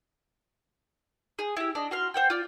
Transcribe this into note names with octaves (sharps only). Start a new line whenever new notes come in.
G#4
E4 G4
D4 D#5
F#4 C6 F6
C5 F#5 G5
F4 D5